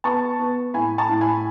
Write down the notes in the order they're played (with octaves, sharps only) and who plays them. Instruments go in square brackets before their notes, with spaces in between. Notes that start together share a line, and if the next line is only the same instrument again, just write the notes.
[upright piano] B3 A5 C#6
B3
A2 G#5 B5
A5 C#6
A2
G#5 B5